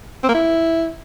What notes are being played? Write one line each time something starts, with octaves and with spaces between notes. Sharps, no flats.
C4
A#3
E4